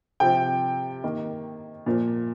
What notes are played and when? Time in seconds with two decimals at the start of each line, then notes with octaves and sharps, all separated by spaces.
0.20 C3 F3 C4 G5
1.04 D#3 A#3
1.86 A#2 F3 A#3